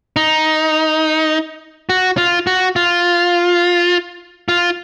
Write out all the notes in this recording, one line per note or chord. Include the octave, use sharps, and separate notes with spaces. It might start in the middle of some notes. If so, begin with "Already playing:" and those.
D#4
F#4
F4
F#4
F4
F4